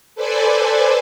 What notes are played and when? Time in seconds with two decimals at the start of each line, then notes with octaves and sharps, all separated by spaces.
0.15 A4 B4 C5 D5 G#5